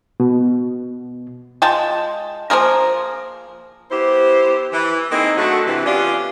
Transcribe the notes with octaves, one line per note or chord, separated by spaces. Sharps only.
B2
G#3 F4 G5 A5
F3 A#3 G#4 A#4
B3 E4 G4 C5
E3
A#3 C4 D#4 E4 G#4
D3 A3 F#4
C3 E3
B3 C#4 D4 F4 G4 D5